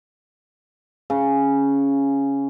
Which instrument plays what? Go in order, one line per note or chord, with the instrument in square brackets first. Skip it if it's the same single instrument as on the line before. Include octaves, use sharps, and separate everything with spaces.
[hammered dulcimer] C#3